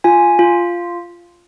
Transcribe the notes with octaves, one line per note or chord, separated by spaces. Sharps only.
F4 G#5
F4